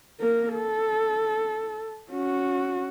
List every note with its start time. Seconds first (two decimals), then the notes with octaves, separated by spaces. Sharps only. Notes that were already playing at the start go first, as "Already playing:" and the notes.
0.20 A#3 A#4
0.54 A4
2.11 C#4 F#4